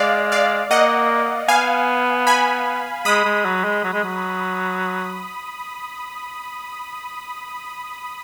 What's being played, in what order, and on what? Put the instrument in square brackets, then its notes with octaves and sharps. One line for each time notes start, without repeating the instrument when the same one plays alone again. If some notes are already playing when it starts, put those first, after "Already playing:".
Already playing: [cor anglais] G#3 [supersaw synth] D5 F5
[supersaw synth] D5 F5
[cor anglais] A#3 [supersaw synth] D#5 F#5
[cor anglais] B3 [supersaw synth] F5 G#5
[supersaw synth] G#5 B5
[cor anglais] G#3 [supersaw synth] B5 D#6
[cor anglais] G#3
F#3
G#3
F#3
G#3
F#3